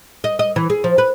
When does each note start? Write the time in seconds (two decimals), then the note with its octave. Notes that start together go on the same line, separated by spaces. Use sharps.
0.24 D#5
0.39 D#5
0.56 E3
0.70 G#4
0.84 F3
0.98 B4